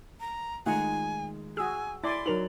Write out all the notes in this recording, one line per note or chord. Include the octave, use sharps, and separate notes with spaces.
A#5
D#3 G#3 A3 D#4 F4 F#5 G#5 A#5
F#4 G#4 G#5 E6
E4 D5 G#5 C6 A6
F#3 D#4 A#4 F7 F#7